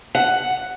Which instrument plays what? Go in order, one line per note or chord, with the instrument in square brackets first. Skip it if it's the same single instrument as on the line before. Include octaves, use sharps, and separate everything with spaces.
[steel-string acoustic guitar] F#5